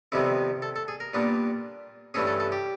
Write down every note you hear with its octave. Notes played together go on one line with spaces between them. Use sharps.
F2 C3 D#3 G3 B3 E4
A4
A4
G#4
A#4
A#2 G3 B3 D4
G2 E3 A3 C#4 G#4
A4
A4
G4